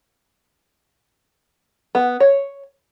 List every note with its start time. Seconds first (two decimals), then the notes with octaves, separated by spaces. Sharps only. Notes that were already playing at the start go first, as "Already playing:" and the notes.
1.95 B3
2.20 C#5